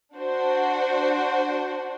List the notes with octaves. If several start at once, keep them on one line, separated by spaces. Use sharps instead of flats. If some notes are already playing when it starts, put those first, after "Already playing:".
D4 F#4 C5